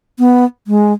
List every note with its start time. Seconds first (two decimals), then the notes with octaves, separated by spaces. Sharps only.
0.19 B3
0.67 G#3